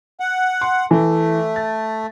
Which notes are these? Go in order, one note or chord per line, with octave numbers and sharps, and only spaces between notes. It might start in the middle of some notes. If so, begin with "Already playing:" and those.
F#5
C6
E3 A3
A6